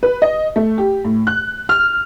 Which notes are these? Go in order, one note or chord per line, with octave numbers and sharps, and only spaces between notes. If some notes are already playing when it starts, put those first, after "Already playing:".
B4
D#5
A3
G4
A2
F#6
F6